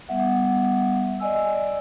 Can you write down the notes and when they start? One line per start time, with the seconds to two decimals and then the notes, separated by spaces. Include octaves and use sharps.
0.09 G3 B3 E5 F#5
1.20 D5 D#5 G#5 E6
1.54 D5